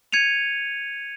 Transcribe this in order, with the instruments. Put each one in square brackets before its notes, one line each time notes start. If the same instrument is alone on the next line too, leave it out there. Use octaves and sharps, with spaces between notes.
[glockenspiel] G#6 C#7 D#7 F7